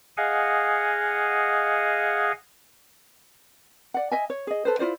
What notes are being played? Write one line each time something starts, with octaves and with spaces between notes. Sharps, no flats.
G#4 D#5 F5 F#5 G#5
D5 F#5
D#5 E5 G#5
C#5
G#4 D#5
A4 B4 C5
E4 F4 C5 D5